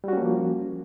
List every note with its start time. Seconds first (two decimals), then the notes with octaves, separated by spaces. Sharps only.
0.04 G3
0.08 F#4
0.13 C#4
0.17 A#3
0.22 F3